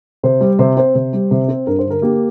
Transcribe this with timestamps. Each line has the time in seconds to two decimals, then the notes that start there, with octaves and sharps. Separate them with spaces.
0.23 C3 C5
0.41 G3
0.59 C3 C5
0.77 C4 C5
0.95 C3
1.13 G3
1.31 C3
1.48 C4
1.67 G2 A#4
1.79 C5
1.85 D3
1.90 A#4
2.02 A#3 G4